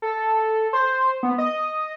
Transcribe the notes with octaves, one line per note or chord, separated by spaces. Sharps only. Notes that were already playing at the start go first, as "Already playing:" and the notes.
A4
C5
B3
D#5